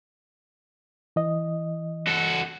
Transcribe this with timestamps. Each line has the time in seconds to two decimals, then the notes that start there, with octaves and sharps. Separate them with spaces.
1.16 E3 D#5
2.07 F#4 A4